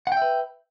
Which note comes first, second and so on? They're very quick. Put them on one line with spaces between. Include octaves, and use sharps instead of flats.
F#5 G5 E5 B4